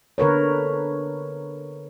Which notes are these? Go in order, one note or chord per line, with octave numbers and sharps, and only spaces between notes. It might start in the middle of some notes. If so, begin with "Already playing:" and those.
D3 A#4 B4 C#5